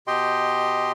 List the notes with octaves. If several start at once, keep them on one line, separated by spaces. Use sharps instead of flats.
B2 G4 D#5 G5 C6